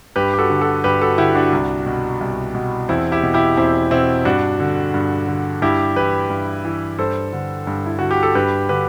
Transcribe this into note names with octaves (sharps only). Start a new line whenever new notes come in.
G2 G4 B4
G4
F#4 A4
D3
F#4 A4
G2 G4 B4
F#4 A4
D3 E4 G4
D4 F#4
C2
B2
C2
B2
E2 C4 E4
E4 G4
B2
E4 G4
E2 C4 E4
B2 C4 E4
G2 D4 F#4
D3
G2
D3
G2 E4 G4
E3 G4 B4
G2
E3
G2 A4 C5
D3
G2
E4
D3 F#4
G4
A4
G2 G4 B4
D3 G4 B4